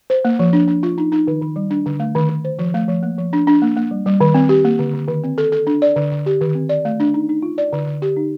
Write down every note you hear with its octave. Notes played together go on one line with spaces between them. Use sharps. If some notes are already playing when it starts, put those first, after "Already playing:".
C5
A#3
F3
D4
D4
F4
D#4
D#4
D#3
D#3
G3
D4
D3
A3
D#3
D#3
C5
F3
A3
F3
A#3
F3
D4
D4
A#3
A#3
G3
G3
D#3
C4
G4
A#3
D3
D3
D#3
C4
A4
A4
D4
D5
D3
D3
G4
D#3
C4
D5
A3
D4
D#4
D#4
F4
D5
D3
D3
G4
D#4